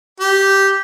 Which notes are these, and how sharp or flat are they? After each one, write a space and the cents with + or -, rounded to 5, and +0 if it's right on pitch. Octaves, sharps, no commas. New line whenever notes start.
G4 -5